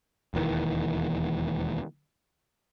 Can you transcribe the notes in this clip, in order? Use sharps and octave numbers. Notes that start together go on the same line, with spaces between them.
E1 D#2 D#3 E3